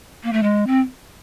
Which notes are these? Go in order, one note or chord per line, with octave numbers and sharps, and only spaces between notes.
A#3
A3
G#3
C4